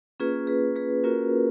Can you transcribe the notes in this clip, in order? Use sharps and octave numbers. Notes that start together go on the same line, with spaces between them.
A#3 C#4 F4 G#4 B4
G#4 B4
G#4 B4
A#3 C#4 F4 F#4 A#4